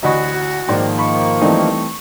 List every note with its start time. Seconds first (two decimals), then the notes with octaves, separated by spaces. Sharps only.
0.03 A1 D2 F#4 D#5 F#5 B5 C#6
0.68 G#2 D#3 F3 A#3 D5 G5 C6
0.99 B5 C#6
1.41 G2 E3 A3 C4 D4 D#4